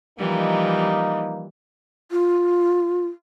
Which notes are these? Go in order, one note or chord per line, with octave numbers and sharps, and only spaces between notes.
E3 F3 G3 A#3 D#4
F4